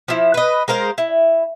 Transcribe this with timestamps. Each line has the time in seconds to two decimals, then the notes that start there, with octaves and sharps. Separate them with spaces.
0.08 F3 E4
0.34 B4 D#5
0.68 G#3 A#4 C5 F5
0.98 E4